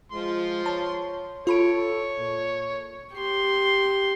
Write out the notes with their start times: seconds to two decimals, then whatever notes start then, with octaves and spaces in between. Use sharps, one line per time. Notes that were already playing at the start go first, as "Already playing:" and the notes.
0.12 F3 G#3 C6
0.66 C#5 A5
1.47 F4 A4 C#5 B5 D7
2.18 A#2
3.13 G4 C6